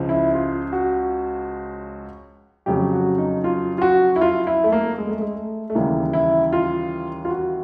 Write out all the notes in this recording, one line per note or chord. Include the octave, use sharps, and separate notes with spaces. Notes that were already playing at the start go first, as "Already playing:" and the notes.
Already playing: C#2 C#3 F3
E4
F4
F#4
F2 C#3 F#3 G4
F#4
D#4
F4
F4
F#4
E4
F4
E4
A3
A#3
G#3
A3
G#3
A3
A3
D#2 C#3 E3 G3 A#3
E4
F4
F4
F#4